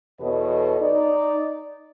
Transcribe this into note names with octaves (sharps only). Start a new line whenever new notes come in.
E2 B2 A4 B4 C#5 D#5
D#4 D5